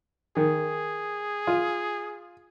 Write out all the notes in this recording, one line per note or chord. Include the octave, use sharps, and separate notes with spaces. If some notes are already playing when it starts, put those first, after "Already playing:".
D#3 G#4
F4